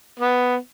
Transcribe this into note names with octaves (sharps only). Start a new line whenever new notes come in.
B3